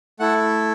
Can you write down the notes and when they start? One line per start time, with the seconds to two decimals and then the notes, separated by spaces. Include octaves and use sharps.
0.20 A3 E4 A4 F#5